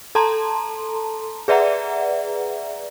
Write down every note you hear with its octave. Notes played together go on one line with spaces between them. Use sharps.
A4 A5 A#5 C6
G#4 B4 D5 E5 F#5 A#5